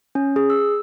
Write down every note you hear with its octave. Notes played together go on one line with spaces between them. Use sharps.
C#4
G#4
E6